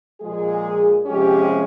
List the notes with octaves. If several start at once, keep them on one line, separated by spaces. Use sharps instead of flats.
A#2 F3 G#3 G#4
C3 F3 G#3 C#4 G4